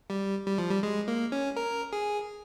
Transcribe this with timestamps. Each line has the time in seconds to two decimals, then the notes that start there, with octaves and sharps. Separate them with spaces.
0.10 G3
0.47 G3
0.58 F3
0.70 G3
0.83 G#3
1.08 A#3
1.32 C#4
1.57 A#4
1.93 G#4